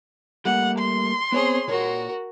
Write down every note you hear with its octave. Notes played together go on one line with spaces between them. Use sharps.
G3 A3 A#3 F#5
C6
B3 C4 G#4 C5 C#5
A#2 F#4 A#4 C#5